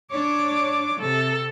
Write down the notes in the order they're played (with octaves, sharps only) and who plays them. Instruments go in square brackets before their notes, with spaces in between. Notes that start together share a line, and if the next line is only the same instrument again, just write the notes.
[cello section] D4 C#5 [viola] D6
[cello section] C3 [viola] A4